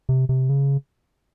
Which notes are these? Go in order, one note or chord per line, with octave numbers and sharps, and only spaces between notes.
C3
C3
C#3